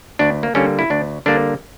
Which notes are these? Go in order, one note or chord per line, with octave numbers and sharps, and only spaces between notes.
D2 D4
A#3
D3 G3 A#3 C#4
E4
D2 D4
D3 G3 A#3 D4